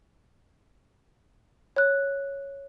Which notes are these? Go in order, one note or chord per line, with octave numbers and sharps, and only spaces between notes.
C#5 F#6